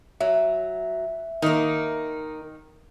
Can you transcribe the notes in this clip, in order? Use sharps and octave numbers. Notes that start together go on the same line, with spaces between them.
F#3 E5
D#3 A#3 D#4